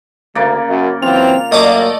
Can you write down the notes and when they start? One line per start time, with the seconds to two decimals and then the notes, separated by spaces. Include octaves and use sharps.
0.35 D2 C#3 A#3 D5
0.70 F#2
1.02 E3 F#3 C4 F4 F7
1.52 F#2 A3 A#3 D5 D#5